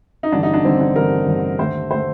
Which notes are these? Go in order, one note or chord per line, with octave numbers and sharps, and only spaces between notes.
D#4
A1 G2 D3 D4
D#4
D4
A1 G2 D3 C4
D4
A1 G2 D3 A#4
A1 G2 D3
D#2 D3 A3 C5
D3 A3 C5